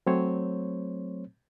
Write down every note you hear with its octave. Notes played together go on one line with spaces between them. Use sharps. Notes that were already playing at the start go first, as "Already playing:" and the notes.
F#3 A3 C4 C5 C#5